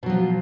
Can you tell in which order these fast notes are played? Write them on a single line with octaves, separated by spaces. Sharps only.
B2 F#3 F3